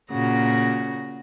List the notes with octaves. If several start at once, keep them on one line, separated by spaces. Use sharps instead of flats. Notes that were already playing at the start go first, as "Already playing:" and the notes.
A#2 C#3 F#4 A#6